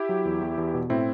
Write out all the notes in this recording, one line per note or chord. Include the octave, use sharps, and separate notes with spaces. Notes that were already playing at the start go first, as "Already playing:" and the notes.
Already playing: E4 G4
F#3
E2
E2
E2
B2
A2 C4 E4